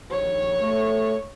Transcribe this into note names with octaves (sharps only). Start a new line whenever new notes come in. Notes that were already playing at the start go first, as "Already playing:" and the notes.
A#1 D#3 C#5
A3